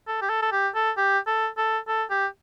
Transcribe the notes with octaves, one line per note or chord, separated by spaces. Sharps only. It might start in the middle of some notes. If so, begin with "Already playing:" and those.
A4
G4
A4
A4
G4
A4
G4
A4
A4
A4
G4